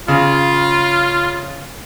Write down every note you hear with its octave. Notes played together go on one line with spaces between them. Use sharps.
C#3 F4